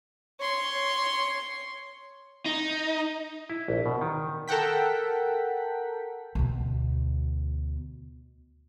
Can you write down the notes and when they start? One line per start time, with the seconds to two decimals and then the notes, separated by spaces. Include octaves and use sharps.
0.40 C#5 C6
2.46 D#4
3.50 E4
3.68 A#1
3.86 B2
4.01 D#3
4.48 A4 A#4 F#5 G5 B6
6.35 D2 B2